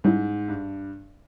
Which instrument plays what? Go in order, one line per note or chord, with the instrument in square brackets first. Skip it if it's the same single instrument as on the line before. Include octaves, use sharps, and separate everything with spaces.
[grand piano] G#2 [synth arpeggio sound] G3 C#4 E4
[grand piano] G2